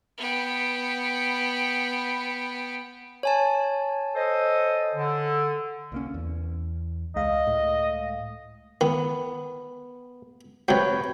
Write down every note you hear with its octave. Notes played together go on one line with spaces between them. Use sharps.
B3 G5
C#5 G#5 A5
A4 C5 D#5
D3
C2 A#3 C#4
E2
C#2 G#3 D#5 F5
A2
D#3 B3
C3 F#3 B4 C#5 G5